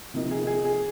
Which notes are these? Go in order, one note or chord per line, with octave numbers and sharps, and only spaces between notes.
C3 F3 A#3 D#4
G#4
G#4
G#4